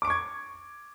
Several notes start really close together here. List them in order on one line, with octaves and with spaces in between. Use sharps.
D6 D7 C#6 G#6